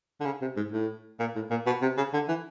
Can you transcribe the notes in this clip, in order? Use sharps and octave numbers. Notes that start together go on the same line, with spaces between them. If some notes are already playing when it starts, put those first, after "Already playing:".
D3
C#3
C3
G#2
A2
A#2
A2
A#2
B2
C3
C#3
D3
E3